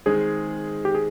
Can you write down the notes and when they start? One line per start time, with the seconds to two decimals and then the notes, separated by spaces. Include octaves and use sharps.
0.06 D#3 G#3 C4 G#4
0.85 G4
0.95 G#4